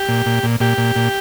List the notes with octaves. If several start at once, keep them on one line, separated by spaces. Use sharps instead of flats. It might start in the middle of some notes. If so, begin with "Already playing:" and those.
Already playing: G4
A#2
A#2
A#2
A#2 G4
A#2
A#2